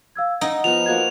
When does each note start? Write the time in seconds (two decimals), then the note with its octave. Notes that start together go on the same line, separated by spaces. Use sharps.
0.16 F5 E6 G#6
0.41 D#4 F#5 A#5
0.64 F3 B3 F4 F7
0.86 A#3 F#4 C5 G#6